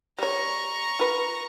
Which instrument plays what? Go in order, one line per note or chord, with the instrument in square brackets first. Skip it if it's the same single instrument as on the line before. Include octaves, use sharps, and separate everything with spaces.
[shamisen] G3 C#5 [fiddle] A#5 C#6
[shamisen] F4 B4